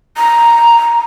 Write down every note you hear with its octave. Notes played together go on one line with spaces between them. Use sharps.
A#5